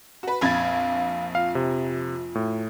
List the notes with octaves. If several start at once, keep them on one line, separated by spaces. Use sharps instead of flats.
F#4 B4
A#1 F2 F5 B5 G#6 A6
F4 F5
C3
A2